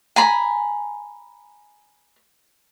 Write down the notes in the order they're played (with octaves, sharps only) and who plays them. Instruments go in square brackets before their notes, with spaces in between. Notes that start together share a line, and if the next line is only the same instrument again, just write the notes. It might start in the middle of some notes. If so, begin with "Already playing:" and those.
[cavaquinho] G#5 A#5 B5